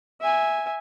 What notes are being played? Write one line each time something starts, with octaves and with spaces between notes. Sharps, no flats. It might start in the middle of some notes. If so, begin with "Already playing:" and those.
E5 G#5